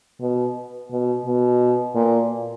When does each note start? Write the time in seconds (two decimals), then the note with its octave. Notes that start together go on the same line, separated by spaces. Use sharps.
0.20 B2
0.91 B2
1.25 B2
1.95 A#2